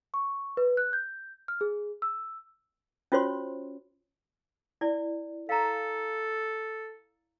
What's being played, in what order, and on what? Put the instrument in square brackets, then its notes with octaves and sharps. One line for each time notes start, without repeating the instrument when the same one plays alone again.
[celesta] C#6
B4
F#6
G6
F6
G#4
E6
[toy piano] C#4 F4 F#4 C5 C#5 C6
E4 D5
[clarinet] A4 [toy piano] F5 A#5